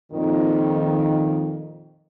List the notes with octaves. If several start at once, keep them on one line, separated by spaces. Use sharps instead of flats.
F2 A#2 D#3